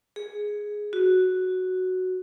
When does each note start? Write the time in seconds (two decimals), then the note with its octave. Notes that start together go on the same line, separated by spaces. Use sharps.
0.16 G#4
0.93 F#4